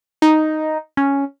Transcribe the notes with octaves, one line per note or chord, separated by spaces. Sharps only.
D#4
C#4